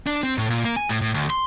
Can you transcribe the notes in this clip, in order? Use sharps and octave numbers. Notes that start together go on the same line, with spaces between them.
D4
C4
A2
A#2
A#3
G#5
A2
A2
D2
C6